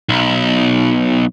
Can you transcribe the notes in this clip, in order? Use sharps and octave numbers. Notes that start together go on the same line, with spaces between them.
B1